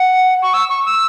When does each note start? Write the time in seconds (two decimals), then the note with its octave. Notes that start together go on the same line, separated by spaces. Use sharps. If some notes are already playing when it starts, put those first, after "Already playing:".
Already playing: F#5
0.43 C#6
0.54 E6
0.69 C#6
0.85 E6